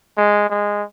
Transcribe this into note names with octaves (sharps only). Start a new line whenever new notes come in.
G#3
G#3